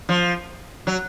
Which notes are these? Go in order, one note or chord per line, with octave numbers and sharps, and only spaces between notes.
F3
F#3